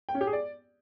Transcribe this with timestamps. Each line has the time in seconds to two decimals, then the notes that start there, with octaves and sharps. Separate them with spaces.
0.09 G5
0.15 C#4
0.21 G4
0.27 G#4
0.33 D5